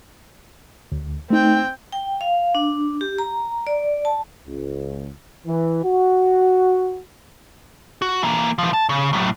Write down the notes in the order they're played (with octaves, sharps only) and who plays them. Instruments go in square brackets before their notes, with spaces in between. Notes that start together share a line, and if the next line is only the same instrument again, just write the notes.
[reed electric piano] D2
[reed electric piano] A3 D#4 [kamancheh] C4 G5
[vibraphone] G5
F5
D4
G4
A#5
D5
A5
[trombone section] C#2
E3
F#4
[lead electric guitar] F#4
E3 A#3
E3 F3
A5
C#3
A2 F#3